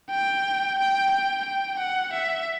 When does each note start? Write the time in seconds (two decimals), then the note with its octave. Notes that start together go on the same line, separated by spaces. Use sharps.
0.11 G5
0.78 G5
1.12 G5
1.45 G5
1.79 F#5
2.13 E5